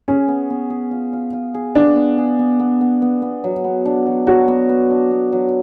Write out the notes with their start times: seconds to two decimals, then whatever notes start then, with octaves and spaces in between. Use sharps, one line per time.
0.08 C#4 G#4
0.28 B3
0.50 B3
0.70 G#4
0.91 F4
1.13 F4
1.33 F4
1.54 G#4
1.75 B3 D4
1.96 B3
2.18 G#4
2.39 B3
2.60 B3
2.81 B3
3.02 B3
3.22 B3
3.44 F#3
3.64 B3
3.85 D4
4.06 F#3
4.27 F#3 F#4
4.48 B3
4.69 B3
4.90 D4
5.11 B3
5.32 F#3